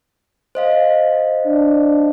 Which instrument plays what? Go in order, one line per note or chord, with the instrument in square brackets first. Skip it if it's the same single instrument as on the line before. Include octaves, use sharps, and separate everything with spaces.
[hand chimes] C5 D#5 F5
[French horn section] D4